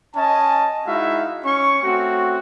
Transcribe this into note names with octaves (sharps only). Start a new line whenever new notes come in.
C#4 D#5 G#5 A5
G#3 D#4 E4 F#4 E5 F5
C#4 C#6
A3 C4 C#4 F#4